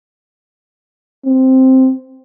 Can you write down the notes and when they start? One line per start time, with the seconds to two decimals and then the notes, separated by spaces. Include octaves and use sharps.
1.26 C4